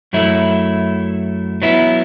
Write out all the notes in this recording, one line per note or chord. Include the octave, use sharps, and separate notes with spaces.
F#2 F#3 A3 E4
F#3 B3 E4